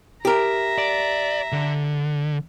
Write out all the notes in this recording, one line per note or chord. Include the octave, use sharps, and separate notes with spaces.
G4 A#4 E5 A#5
D5
D3